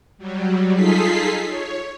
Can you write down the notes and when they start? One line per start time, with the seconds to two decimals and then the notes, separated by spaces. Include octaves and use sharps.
0.18 F#3 G3
0.73 D#4 F4 G#4 A4 B6 C7
1.46 C#5